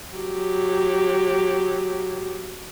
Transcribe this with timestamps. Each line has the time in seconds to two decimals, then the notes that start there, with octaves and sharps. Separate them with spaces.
0.15 F#3 G4